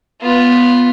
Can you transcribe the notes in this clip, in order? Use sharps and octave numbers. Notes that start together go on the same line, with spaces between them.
B3 F4